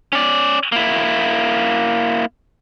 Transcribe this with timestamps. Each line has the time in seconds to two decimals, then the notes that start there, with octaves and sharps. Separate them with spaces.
0.13 C#4 D5
0.72 A#3 E4